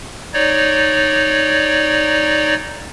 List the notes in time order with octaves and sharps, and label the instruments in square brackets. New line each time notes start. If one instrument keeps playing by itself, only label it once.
[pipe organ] D#4 C#5 D5